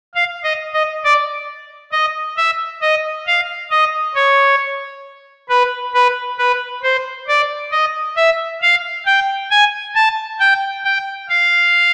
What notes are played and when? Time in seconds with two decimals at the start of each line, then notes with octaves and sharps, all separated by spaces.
0.15 F5
0.44 D#5
0.74 D#5
1.04 D5
1.92 D#5
2.37 E5
2.82 D#5
3.27 F5
3.71 D#5
4.15 C#5
5.49 B4
5.94 B4
6.38 B4
6.83 C5
7.28 D5
7.72 D#5
8.17 E5
8.61 F5
9.06 G5
9.51 G#5
9.95 A5
10.40 G5
10.85 G5
11.29 F5